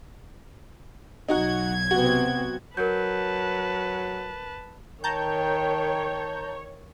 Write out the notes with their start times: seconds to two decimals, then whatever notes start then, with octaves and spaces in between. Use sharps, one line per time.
1.28 B1 F#3 D#4 F#4 F#5 G#6
1.91 C3 B3 C4 F#4
2.77 F#3 A#4 B4 A5 G6
5.04 D#3 C#5 G5 A5 A#5 G6